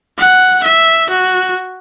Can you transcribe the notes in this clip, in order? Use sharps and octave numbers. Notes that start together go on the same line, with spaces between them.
F#5
E5
F#4